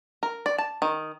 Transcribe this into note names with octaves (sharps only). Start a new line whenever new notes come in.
A#4
D5
A5
D#3